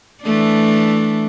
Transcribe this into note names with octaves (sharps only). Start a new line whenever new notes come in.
E3 A3 D4